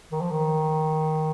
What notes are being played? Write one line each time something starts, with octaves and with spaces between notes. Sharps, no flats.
D#3
F3
D#3